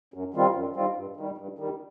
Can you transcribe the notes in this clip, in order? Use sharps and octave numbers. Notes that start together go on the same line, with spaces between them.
F#2
D#3 G3 C4 F4
F#2
D#3 G3 C4 F4
G2
D#3 G3
G2
D#3 G3